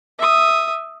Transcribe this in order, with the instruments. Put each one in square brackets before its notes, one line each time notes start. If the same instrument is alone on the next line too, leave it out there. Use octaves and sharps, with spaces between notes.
[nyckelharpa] E5 D#6